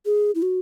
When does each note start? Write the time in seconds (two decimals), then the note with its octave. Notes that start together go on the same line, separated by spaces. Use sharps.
0.05 G#4
0.35 E4
0.42 F#4